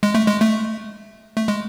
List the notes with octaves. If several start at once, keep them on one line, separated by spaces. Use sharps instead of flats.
G#3
A3
G#3
A3
A3
G#3